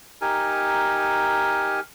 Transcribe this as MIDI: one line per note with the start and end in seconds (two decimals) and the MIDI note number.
0.21 1.80 63
0.21 1.80 67
0.21 1.80 70
0.21 1.80 80